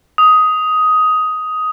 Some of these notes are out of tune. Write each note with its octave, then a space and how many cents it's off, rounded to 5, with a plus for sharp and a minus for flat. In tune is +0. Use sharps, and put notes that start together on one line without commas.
D#6 +10